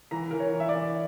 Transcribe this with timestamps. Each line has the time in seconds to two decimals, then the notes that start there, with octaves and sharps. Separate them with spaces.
0.11 E3 A#5
0.31 E3 A#4
0.40 C#5
0.54 E3
0.60 E5
0.69 D5
0.75 E3